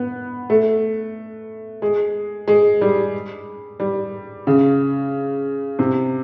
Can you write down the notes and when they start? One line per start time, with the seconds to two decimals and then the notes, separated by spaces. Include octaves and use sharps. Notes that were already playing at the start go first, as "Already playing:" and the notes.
Already playing: B3
0.50 A3
1.82 G#3
2.48 G#3
2.81 G3
3.80 G3
4.47 C#3
5.79 C3